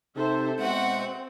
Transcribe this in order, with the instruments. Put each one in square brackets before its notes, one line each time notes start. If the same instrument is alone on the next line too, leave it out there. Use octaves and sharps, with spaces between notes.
[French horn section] C3 [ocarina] D#4 [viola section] A4 C5 E5
[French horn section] B2 G#3 [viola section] C4 [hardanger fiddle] F#4 F#5 [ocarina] E5